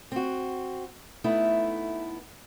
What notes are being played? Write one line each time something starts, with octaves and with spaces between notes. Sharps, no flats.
C4 F#4
A3 B3 D#4 E4